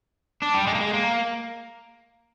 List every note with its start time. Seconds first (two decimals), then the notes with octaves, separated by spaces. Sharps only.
0.42 D4
0.54 G3
0.67 G#3
0.75 A#3
0.81 G#3
0.94 A#3